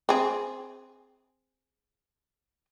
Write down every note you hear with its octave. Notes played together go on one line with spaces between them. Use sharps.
C4 G#4